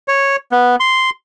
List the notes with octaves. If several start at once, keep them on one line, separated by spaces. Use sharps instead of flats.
C#5
B3
C6